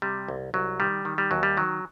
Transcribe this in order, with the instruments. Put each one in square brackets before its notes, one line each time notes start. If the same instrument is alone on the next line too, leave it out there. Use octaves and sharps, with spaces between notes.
[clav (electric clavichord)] C3 G3
C2
C2 F#3
D#3 G3
D#3
G3
D#2 F#3
G3
D#3 F#3